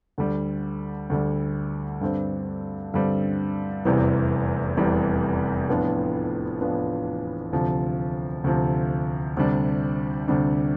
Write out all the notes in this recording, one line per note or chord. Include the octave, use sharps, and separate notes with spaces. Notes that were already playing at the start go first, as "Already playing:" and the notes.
D2 D3 G3
D2 D3 G3
G2 D3 G3 C4
G2 D3 G3 C4
F1 E2 C3 E3 G3
F1 E2 C3 E3 G3
A2 F3 B3 D4 F4
A2 F3 B3 D4 F4
D2 C3 F3
D2 C3 F3
D2 C3 G3 D4
D2 C3 G3 D4